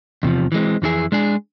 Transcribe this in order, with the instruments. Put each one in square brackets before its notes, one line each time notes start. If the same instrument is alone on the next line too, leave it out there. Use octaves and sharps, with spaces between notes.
[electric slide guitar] E2 C3 F3
E3 G#3 C4
F2 E3 B3 E4 G#4
G#3 D4 G#4